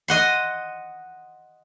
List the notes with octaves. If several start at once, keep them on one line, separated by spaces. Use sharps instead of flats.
D#5 F#5 C6